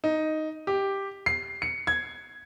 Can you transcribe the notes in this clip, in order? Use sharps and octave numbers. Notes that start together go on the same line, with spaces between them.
D#4
G4
C7
C#7
G#6